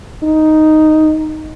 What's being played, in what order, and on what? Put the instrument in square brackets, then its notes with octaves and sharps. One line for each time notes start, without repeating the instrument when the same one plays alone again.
[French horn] D#4